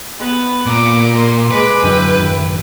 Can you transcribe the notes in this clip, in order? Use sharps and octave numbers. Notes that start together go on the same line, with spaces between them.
B3 B4
A#2 D6
A#3 C6
G#3 B4 D6
F#2 D3 F#3 E4 G5
A1 F#2 D#3